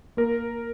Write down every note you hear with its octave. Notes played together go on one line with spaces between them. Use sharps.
A#3 A#4